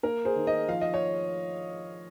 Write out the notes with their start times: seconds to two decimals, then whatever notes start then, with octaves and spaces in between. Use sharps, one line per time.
0.03 A#3 A#4
0.25 G#4 C5
0.36 D#3
0.47 C5 D#5
0.68 F3 F5
0.81 D#5
0.94 C#5